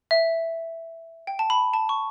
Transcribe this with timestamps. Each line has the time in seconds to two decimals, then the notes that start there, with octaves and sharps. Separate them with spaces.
0.11 E5
1.27 G5
1.39 A5
1.50 B5
1.73 A5
1.89 C#6